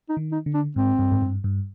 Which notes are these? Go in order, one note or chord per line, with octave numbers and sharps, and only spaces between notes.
D#4
D#3
D#4
D3
D4
G#2 C4
G2
G#2
G2
G2